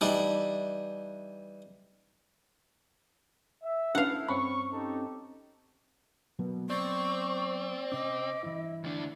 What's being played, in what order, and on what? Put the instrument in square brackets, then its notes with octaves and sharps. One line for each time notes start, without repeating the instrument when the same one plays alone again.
[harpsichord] E3 G3 D4 D#4
[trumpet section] E5
[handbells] C#4 D4 B4 [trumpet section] E4 A4 [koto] F5 F#5
[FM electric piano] G2 C4 C#4 [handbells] B5 [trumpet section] C#6
[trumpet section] D#4 G4 A4
[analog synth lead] B2 [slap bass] F#3 A#3 B3
[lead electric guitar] C4 [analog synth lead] D5 [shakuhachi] C#6
[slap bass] C3 C#4 [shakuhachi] D#5 [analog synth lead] D6
[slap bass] G2 E3 [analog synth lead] E4
[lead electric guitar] D2 D4